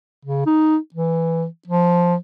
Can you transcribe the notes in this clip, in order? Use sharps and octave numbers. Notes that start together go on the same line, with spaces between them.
C#3
D#4
E3
F3